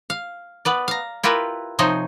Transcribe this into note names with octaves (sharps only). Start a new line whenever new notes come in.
F5
B3 B4 D5
F5 A#5
E4 F4 G4 A#4 B4
C3 F3 D#4 C5 C#5 G#5